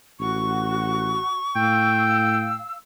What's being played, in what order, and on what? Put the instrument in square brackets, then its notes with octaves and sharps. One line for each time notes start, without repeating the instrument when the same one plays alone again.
[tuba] A1 [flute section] F#4 [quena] C#6
[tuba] A2 [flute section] F5 E6 [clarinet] G5